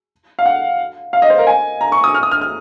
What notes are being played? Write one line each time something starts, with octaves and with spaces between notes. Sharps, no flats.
F5
F#5
F5
D#5
C5
A#4
G#5
A#5
C#6
D#6
F6
D#6
F6
F6